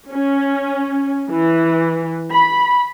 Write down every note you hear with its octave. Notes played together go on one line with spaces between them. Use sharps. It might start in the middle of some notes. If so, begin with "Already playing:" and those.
C#4
E3
B5